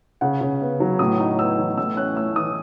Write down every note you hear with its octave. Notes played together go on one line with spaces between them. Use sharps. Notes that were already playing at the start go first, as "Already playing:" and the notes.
C#3 F#5
C#3
B3
F#3
A2 D#6
D#4
B3 E6
E3
A2 E6
C#4 F#6
A3 E6
E3 D#6